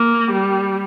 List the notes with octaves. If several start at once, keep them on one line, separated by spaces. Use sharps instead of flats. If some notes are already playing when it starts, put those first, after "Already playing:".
Already playing: A#3
G3